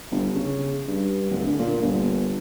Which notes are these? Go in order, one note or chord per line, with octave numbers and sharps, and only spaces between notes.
G1
C#3
G2
D1
D3
A#2
G1